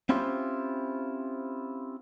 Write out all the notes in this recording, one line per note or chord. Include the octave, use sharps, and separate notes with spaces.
C4 C#4 E4 F4 G4 C5